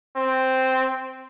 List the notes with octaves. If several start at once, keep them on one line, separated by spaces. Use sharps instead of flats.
C4